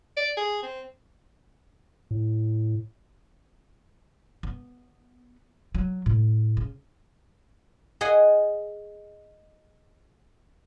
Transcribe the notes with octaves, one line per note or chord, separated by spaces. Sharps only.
D5
G#4
C4
A2
B3
F#3
A2
C#3
G#4 D#5 F#5